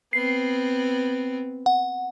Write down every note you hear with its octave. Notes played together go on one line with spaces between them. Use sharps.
B3 C4 C7
F#5